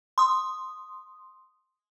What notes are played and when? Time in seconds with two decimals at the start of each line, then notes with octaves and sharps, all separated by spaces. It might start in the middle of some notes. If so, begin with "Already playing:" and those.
0.18 C6 D#6